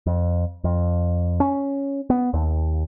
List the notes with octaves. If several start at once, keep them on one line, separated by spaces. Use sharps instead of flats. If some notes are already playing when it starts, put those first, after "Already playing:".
F2
F2
C#4
B3
D#2